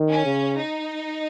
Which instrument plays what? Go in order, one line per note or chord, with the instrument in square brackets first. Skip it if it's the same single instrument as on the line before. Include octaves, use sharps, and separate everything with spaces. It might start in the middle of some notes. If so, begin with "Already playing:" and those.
Already playing: [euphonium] D#3
[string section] C#4
[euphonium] C#3
[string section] D#4